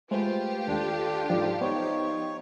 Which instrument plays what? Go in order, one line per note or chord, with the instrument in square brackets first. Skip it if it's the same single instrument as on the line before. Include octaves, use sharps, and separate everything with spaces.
[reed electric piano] G#3 A3 C5 [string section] F4 G4 [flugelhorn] B4
[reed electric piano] D#2 [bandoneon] D4 [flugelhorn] A4
[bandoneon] G#2 [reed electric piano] F3 [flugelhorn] D5
[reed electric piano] B3 C5 [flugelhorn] D#4 [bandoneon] C#5